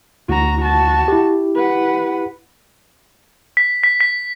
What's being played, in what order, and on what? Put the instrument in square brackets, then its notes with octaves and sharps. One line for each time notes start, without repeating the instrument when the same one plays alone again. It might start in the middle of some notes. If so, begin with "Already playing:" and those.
[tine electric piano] D2 [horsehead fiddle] F#4 A#5
[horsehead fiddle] F#4 A5
[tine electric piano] E4 G4
[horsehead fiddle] B4 F#5
[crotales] B6
B6
B6